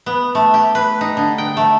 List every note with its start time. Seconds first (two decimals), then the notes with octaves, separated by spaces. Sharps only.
0.06 B3
0.35 A3
0.54 G4
0.75 B4
1.01 D#4
1.17 D3
1.38 G5
1.57 A3